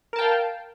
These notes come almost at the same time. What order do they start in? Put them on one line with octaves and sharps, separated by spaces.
A#4 A5 G5 F5